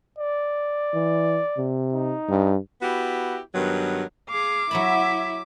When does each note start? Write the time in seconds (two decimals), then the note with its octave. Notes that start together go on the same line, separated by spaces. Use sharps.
0.18 D5
0.94 E3
1.57 C3
1.93 D#4
2.29 G2
2.82 B3 E4 F#4 G4
3.54 G2 D#3 F#3 B3
4.30 G#4 F5 D6
4.71 F#3 E4 E5 A#5 B5